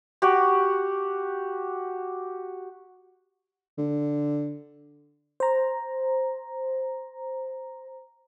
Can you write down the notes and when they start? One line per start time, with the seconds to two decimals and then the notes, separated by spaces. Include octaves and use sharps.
0.22 F#4 G4
3.78 D3
5.40 C5 A#5